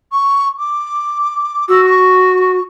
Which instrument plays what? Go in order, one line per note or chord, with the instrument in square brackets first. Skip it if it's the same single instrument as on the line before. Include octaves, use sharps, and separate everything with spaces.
[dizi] C#6
D6
[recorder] F#4 [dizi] E6
[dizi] C#6